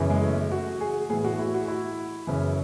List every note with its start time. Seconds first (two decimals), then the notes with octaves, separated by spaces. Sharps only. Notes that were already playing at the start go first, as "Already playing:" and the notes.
Already playing: F#2 C#3 E3
0.10 G#3
0.21 A3
0.52 F#4
0.81 G#4
1.10 A2 E3 G#4
1.25 F#4
1.39 E4
1.54 F#4
1.68 E4
2.27 F#2 C#3 E3